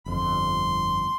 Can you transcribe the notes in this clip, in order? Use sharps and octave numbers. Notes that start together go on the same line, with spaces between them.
G1 F2 C6